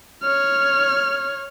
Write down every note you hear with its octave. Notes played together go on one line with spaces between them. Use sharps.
C#5 F6